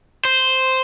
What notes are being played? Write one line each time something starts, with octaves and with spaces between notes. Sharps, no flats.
C5